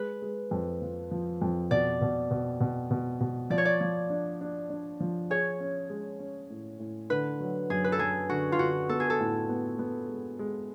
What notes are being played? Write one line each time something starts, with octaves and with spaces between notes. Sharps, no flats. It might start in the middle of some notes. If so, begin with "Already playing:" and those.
Already playing: G#3 B4
G#3
F2
F3
F3
F2
B2 D5
B2
B2
B2
B2
B2
F3 D5
C#5
D5
F3
D4
D4
D4
F3
G#4 C#5
C#4
G#3
C#4
A2
A2
D3 B4
F#3
F#2 G#4
B4
A4
F#2 G#4
D3 F#4
F4
D3 F#4
B3 A4
G#4
A4
A2
B3
B3
G#3
G#3